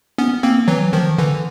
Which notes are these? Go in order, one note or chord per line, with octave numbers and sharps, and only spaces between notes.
B3 C#4
A#3 C4
E3 F#3
D#3 F3
D3 E3